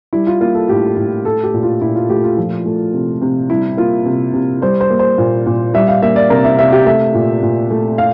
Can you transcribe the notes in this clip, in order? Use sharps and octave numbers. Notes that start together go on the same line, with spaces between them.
G3 E4
F4
A#3 F4
A4
A2 G4
A2
A3 A4
G4
A#2
F4
A#2 E4
F4
A3 G4
F4
F3
A3
C3
C3
G3 E4
A#3 F4
C3
C3
G3 C5
C5
A#3
C5
A#2
A#2
G3 E5
F5
A#3 E5
D5
C3 A#4
E5
C3 E5
G4
A3 E5
A#2
A#2
A3
F5